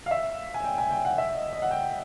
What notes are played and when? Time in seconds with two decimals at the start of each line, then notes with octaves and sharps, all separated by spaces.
0.06 F5
0.11 E5
0.54 G#5
0.64 G5
0.78 G#5
0.90 G5
1.05 F#5
1.18 E5
1.35 D#5
1.53 D#5
1.62 F#5
1.71 G5